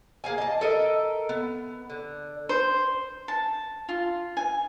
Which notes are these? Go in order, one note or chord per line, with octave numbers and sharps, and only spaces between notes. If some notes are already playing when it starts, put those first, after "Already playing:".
A#3 G#4 F5 G#5
D#5 A5
A4 A#4 D#5 E5
B3
D3
C5
A5
F4
G#5